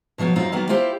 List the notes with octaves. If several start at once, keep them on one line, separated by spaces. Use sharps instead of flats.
B2 F3 F#3 B3
F#2 F#3 C4 D#4 F4
D#3 F#3 A#3 B3
E4 F4 G4 C5